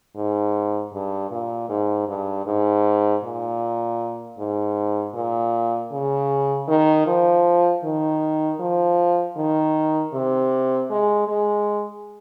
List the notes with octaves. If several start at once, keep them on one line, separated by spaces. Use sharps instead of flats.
G#2
G2
A#2
G#2
G2
G#2
A#2
G#2
A#2
C#3
D#3
F3
D#3
F3
D#3
C3
G#3
G#3